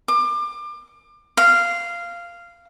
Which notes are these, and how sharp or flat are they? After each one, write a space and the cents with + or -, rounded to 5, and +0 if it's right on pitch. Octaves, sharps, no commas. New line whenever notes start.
D6 +30
F5 -10